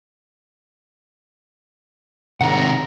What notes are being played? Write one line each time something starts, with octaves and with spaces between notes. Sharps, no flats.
G#1 A2 C3 D#3 F#5 A#5